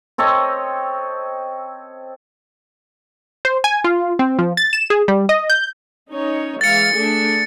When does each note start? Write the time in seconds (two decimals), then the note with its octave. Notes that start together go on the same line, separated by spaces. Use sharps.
0.18 C4 A4 C#5 D#5
3.45 C5
3.64 G#5
3.84 F4
4.19 C4
4.39 F3
4.57 A6
4.73 E7
4.90 G#4
5.08 G3
5.29 D#5
5.50 G6
6.11 C#4 D#4 C#5
6.61 E3 G#3 F5 A6 C#7
6.94 A3 D4 G#4